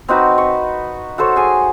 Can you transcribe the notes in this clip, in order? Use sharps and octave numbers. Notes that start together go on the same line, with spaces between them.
C4 D#4 F#4 B4
C#6
F#4 A4 C5 C#5
G#4 G#5 A5